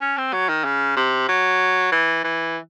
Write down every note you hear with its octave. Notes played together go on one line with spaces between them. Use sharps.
C#4
C4
F#3
D#3
C#3
C3
F#3
E3
E3